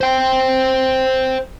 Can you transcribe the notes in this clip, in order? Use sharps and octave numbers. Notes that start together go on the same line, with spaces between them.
C5 G5